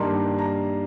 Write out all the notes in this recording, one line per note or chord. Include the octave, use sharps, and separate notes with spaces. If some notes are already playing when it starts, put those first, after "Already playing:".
Already playing: G2 D#3 G3 A#3 D#4 C6
A#5